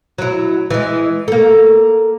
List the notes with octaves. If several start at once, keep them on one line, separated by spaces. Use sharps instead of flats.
F#3 E4
E3 G#3
A#3 A4